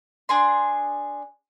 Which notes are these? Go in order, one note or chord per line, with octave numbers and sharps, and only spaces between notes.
D4 G#4 C6